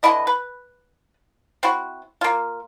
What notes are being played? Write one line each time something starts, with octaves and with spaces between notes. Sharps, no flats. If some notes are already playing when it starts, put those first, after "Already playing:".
D3 E3 E4 D#5
B4
C4 E4 F#4
A#3 F4